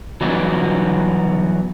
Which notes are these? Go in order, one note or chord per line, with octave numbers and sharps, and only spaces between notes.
E3 F#3 G3 B3 D#4 F#4